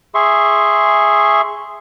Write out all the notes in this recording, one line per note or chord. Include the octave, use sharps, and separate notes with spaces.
G#4 E5 C6 C#6